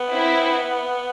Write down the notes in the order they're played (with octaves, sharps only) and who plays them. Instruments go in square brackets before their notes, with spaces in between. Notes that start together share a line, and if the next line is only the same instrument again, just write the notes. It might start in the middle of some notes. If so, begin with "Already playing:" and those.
Already playing: [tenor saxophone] B3
[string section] C4 E4